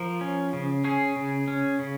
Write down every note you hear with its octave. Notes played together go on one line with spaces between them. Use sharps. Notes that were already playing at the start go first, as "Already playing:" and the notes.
Already playing: F3 A#4
C#4
C#3
C#4 G#4
C#3
C#4
C#3